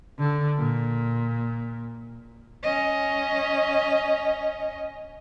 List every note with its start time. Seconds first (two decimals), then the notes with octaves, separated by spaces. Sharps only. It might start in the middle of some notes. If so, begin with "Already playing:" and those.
0.19 D3
0.58 A#2
2.63 C#4 D#5